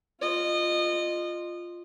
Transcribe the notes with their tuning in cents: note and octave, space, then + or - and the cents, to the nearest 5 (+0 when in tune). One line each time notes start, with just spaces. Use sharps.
F4 +0 D#5 -25